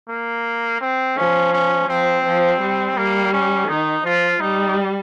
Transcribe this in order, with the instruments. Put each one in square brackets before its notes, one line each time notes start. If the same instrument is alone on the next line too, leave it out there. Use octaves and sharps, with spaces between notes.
[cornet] A#3
C4
[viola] F3 [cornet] C#4
[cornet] C#4
[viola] F3 [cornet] C4
[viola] F3
G3
[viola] G3 [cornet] A#3
[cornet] C#4
[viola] D#3 [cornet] D#4
[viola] F3 [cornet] F4
[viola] G3 [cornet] D#4